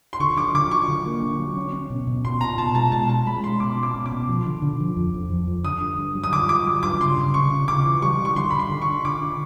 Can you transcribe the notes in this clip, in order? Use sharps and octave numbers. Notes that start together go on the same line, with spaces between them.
C6
D3 C#6
F#3 D6
D3 D6
F#3 C#6
D3
A#3
D3
F#3
C#4
C#4
B2
B2
B2 C6
B2 A#5
B2 A5
G#3 A5
B2 A5
C#4 A5
G#3 B5
C#4 C6
B2 D6
C#4
D6
B2
D6
B2
F3
D3
D3
F3
F2
F2
F3
F2
D3 D#6
G2
G2
F#3
D#6
D3 D6
G2 D6
F#3
G2 D6
C#3 C6
C#3
C#3 C#6
C#3
C#3 D6
E3
G3 C#6
G3
C#6
D3 C6
D3 B5
C6
D3
C#6
D3
D3 D6
D3